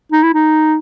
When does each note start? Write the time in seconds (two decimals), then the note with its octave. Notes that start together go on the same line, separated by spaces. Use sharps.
0.12 D#4
0.23 E4
0.34 D#4